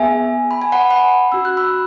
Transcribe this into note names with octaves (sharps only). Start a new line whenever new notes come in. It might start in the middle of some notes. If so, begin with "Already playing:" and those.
Already playing: B3 G#4 E5 G#5
B5
G#5
F#5 B5
F#5 B5
C#4 F#4 E6
F#6
B5 E6